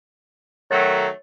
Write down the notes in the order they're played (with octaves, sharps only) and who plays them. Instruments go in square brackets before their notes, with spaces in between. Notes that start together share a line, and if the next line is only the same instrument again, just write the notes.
[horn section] D#3 F#3 A3 [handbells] C#5 A6